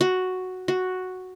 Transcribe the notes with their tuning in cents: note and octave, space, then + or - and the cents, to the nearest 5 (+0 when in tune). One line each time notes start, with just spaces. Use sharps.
F#4 +0
F#4 +0